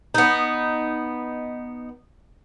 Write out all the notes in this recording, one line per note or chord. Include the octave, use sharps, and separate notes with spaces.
B3 D#4